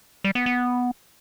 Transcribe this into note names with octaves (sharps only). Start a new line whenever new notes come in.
G3
B3
B3